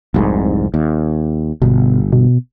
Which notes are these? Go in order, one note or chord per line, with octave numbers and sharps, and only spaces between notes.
F1 C2 G#2
D#2
G1 B2
B2